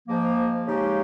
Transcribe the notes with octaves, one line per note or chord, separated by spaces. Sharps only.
G#2 F3 A#3
C#3 G#3 D#4 G4